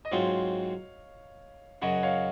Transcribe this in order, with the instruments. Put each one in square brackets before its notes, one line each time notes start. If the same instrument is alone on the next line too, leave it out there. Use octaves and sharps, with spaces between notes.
[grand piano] D#5
[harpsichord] G#2 F#3 C4 F4 [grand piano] C#5 F5
[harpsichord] F#2 C#3 F#3 [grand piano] D#5 F#5
[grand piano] C#5 F5